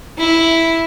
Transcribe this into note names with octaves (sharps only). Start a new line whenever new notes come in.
E4